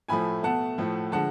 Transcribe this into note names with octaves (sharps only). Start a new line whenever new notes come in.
A2 F3 A3 G#5 B5
B2 A3 F#5 A5
A2 F3 A3
D3 F3 G#3 F#5 A5